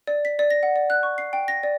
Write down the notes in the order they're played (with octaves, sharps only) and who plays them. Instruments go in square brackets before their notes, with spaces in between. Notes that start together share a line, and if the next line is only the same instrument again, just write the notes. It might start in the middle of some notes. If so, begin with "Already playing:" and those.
[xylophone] D5
B6
D5
A#6
F#5
D5
F#6
C#6
C7
G5
A#6
D5